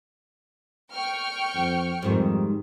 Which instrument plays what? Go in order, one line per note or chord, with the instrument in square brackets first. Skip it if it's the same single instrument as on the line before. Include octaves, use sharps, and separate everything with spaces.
[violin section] G5 C#6 F6
[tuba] F2
[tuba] F2 [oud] G#2 D#3 G3